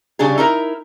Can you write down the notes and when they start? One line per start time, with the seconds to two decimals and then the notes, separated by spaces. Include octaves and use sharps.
0.19 C#3 G3 D4 G#4
0.38 D#4 E4 A#4